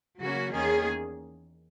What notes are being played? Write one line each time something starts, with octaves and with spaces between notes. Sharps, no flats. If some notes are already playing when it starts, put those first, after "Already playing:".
C#3 F#3 A#3 C#4 F#4
E2 D#3 A#3 C#4 G#4